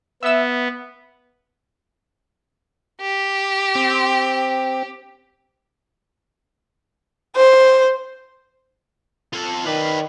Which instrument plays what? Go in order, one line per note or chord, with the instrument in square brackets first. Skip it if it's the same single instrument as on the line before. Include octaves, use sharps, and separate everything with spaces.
[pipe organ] B3 [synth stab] E5 E6
[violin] G4
[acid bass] C4
[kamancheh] C5
[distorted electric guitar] F4 A4
[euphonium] D#3 [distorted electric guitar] B4 D5